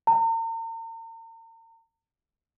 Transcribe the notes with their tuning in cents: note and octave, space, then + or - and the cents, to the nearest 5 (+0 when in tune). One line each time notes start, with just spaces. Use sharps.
A#5 -40